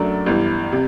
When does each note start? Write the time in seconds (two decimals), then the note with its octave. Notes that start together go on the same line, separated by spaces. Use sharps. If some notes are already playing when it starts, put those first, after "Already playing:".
Already playing: F#2 F#3 A3 D4
0.26 G1 G2 E3
0.72 C3